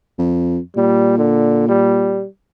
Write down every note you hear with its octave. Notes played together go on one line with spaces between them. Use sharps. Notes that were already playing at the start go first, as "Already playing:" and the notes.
F2
A#2 G3
D3
G3